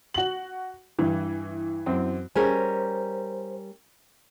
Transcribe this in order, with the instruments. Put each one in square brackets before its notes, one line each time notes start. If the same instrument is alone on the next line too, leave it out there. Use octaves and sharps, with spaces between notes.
[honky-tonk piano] F#4 F#7
[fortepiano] G2 [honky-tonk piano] E3
[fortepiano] F#2 C4
[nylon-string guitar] G3 C#4 A#4 [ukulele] G#4 [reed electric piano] C5